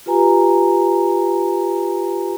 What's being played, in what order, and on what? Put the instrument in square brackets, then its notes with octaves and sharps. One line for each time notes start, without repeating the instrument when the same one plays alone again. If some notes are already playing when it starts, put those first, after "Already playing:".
[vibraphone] F4 G4 B4 G#5 A#5